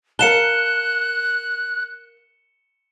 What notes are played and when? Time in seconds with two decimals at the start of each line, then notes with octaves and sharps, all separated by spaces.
0.19 A#4 F5 A5 F#6 C#7 E7 G7